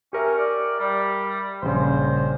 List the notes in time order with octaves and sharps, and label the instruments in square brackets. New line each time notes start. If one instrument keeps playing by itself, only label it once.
[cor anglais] C#4 [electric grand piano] G4 A#4 E5
[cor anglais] D5
G3
[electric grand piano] A#1 G2 C#3 [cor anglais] C5